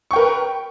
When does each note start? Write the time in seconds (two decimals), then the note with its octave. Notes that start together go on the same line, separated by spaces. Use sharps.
0.11 C#6
0.13 G5
0.16 A#4
0.19 B4